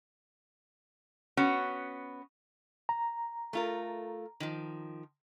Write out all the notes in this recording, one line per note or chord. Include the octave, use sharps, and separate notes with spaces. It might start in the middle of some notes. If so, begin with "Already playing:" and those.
B3 C#4 F#4
A#5
A3 F4 A#4
D#3 F3